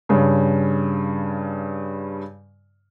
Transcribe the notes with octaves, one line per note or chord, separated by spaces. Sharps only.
G2 C#3